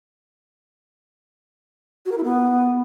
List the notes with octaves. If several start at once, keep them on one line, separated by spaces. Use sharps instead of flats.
F#4
A#4
E4
B3